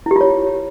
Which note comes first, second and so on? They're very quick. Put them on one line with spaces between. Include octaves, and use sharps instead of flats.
E4 G4 F4 C#5